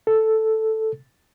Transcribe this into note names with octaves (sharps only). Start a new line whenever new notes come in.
A4